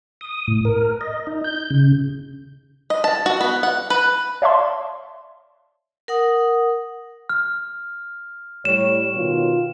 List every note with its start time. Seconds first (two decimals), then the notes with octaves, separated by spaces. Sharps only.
0.21 D#6
0.48 A2
0.65 A#4
1.01 D#5
1.27 D#4
1.44 G6
1.70 C#3
2.90 D#5
3.04 A5
3.26 F#4
3.41 B3
3.63 F#5
3.90 B4
4.42 C#5 D5 E5 F5 A5 C6
6.08 A#4 F#5 D#6
7.29 F6
8.65 A2 G3 C#5 E7
9.15 B2 D#3 F4